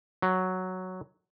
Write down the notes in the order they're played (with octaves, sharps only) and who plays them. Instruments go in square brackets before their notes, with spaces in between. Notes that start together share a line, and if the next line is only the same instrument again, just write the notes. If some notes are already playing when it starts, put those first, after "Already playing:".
[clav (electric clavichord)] F#3